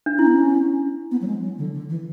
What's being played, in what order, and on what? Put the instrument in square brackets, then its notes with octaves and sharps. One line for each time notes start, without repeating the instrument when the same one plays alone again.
[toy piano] D4
[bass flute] C#4 [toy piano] E4
[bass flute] B3
C#4
B3
F#3
G#3
F#3
D3
D3
E3